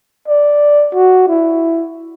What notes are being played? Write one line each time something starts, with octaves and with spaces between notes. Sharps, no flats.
D5
F#4
E4